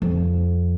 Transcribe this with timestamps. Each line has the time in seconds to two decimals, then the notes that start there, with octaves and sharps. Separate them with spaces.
0.02 F2